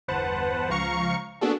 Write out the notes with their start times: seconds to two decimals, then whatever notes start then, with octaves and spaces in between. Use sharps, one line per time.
0.08 G1 E2 B4 C5 F#5 A5
0.70 C#2 F3 F5 A#5 C#6 C#7
1.41 A#3 B3 D4 F#4 G#4 A4